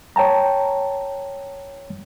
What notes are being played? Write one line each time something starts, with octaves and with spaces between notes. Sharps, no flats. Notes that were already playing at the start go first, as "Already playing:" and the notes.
C#5 G5 A5 A#5